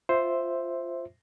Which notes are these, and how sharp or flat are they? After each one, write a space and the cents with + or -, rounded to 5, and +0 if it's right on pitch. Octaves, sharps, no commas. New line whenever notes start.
F4 +0 C5 +0 E5 +0